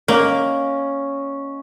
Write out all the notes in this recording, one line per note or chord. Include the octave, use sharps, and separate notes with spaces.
A#3 C#4 D#5